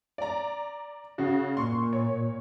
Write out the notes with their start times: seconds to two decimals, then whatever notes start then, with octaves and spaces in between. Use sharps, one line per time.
0.18 D5 A#5
1.18 C#3 F#4
1.57 A#2 C6 C#6
1.93 C#5